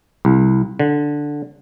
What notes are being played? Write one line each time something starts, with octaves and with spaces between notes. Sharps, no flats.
C2
D3